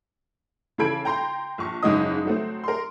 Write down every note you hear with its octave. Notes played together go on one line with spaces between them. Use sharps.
C#3 E3 A4 B5 G#6 D7
G5 A#5 C6
A#1 C#6
F#1 G#2 C#3 G#3 D#5 D#6
F#3 A3 C4
A#4 C6